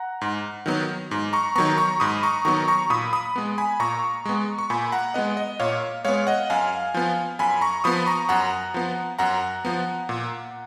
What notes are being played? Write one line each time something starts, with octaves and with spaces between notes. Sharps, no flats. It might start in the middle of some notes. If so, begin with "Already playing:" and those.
Already playing: F#5 A#5
G#2
D#3 F#3 B3
G#2
A#5 C#6
D#3 F#3 B3 A#5 C#6
A#5 C#6
G#2 B5 D#6
A#5 C#6
D#3 F#3 B3 A#5 C#6
A#5 C#6
A#2 B5 D#6
B5 D#6
G#3 B3
G#5 B5
A#2 A#5 C#6
G#3 B3
C#6
A#2 G#5 B5
F#5 A#5
G#3 B3 D#5 F#5
D#5
A#2 C#5 F5
G#3 B3 C#5 F5
D#5 F#5
F#2 F5 G#5
F3 B3
F#2 G#5 B5
A#5 C#6
F3 B3 B5 D#6
A#5 C#6
F#2 F#5 A#5
F3 B3
F#2 F#5 A#5
F3 B3
A#2